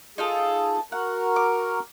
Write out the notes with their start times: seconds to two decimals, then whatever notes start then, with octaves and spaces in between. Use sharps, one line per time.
0.18 D#4 F4 G#4 A4
0.92 F#4 A#4 F#5
1.36 D6